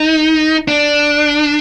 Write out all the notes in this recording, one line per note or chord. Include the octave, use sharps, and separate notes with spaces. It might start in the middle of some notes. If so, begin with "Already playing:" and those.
Already playing: D#4
D4